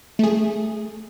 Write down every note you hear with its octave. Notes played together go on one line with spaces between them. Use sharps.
A3 G#4